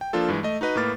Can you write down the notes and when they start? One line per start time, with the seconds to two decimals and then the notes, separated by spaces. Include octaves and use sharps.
0.01 G5
0.13 F3 A#3 D4 F4 A4
0.28 G2 E3 G#3
0.43 A3 D#5
0.61 D#4 F#4 B4 D#5
0.76 A2 A#3 B4 D6 F6 A6